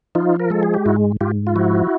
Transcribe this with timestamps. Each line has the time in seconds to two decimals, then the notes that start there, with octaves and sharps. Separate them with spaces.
0.15 F3 D#4 F4
0.39 A#4
0.50 G#3 A4
0.63 G#4
0.74 G4
0.86 G#2 E4 F#4
1.21 G#2 F4 G4
1.47 F4
1.56 F3 E4 F#4